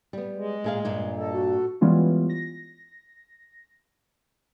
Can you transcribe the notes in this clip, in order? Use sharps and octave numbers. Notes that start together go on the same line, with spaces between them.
G3 B3
G#3
A#2 G#4 F5
G2 A#2
A4 D#5
F#4
E3 G3 G#3 B3 C#4 F4
A#6